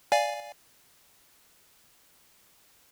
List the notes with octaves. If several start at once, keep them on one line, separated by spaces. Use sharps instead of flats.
D5 F5 G#5